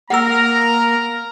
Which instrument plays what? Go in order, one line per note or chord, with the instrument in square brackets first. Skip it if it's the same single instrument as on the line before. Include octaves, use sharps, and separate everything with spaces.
[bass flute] A#3 [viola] A#4 [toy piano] F#5 E6 [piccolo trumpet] A#5